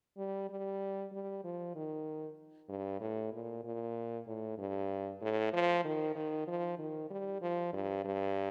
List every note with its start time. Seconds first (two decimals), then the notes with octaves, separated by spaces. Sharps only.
0.18 G3
0.50 G3
1.12 G3
1.44 F3
1.75 D#3
2.69 G2
3.01 A2
3.33 A#2
3.64 A#2
4.27 A2
4.58 G2
5.22 A2
5.53 F3
5.85 D#3
6.16 D#3
6.48 F3
6.79 D#3
7.11 G3
7.42 F3
7.73 G2
8.05 G2